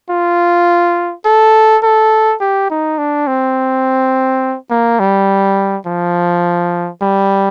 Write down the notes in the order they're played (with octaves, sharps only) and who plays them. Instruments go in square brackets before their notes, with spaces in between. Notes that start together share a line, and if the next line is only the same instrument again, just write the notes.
[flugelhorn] F4
A4
A4
G4
D#4
D4
C4
A#3
G3
F3
G3